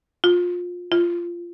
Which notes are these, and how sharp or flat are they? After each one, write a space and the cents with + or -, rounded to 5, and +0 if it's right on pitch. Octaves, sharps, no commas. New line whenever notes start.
F4 +20
F4 -15